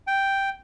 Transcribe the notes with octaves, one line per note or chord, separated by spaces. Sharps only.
G5